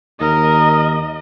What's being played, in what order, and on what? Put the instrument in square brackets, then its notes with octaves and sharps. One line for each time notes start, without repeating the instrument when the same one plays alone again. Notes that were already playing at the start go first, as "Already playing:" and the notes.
[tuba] D#2 [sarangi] A#4 [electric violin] D#5